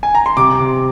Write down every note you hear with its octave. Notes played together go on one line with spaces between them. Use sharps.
G#5
A#5
C6
C3 D6
C3